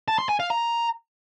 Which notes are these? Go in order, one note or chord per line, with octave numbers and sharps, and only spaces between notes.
A5
C6
G#5
F5
A#5